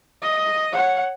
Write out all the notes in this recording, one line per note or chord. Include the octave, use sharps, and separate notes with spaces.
D#5
C#5 F#5